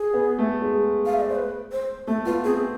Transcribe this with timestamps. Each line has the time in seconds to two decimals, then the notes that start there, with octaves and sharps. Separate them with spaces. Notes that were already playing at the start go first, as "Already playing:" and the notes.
Already playing: G#4
0.13 B3
0.38 A3
0.62 G#3
1.06 F5
1.13 E5
1.21 D5
1.28 C5
1.36 B4
1.72 C5
2.07 A3 A4
2.26 B3 F4
2.44 C4 G#4